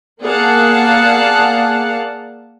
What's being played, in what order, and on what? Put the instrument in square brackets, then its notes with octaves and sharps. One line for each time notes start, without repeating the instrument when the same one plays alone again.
[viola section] A#3 G#4 D5 F5 F#5 A5